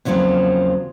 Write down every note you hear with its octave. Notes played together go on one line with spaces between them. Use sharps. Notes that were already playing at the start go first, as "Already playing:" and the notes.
E2 C#3 F3 F#3 A#3 C4